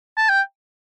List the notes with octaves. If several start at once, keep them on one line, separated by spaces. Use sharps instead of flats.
A5
G5